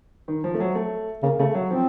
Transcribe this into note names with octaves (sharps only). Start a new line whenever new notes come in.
D#3
F3
A3
F#3
A3
C#3 A#3
C#3 A3
F#3
F3 C4